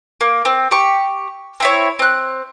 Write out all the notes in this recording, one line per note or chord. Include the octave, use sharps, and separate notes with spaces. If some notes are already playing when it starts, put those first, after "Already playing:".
A#3
C4
G4 C#6
C4 E4 C#5
C4 F#6